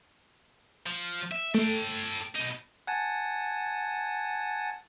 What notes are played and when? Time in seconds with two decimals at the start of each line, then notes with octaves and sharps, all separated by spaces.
0.86 F3
1.31 E5
1.54 A3 A4 G5
2.35 B2 D#4
2.87 F#5 G#5 A5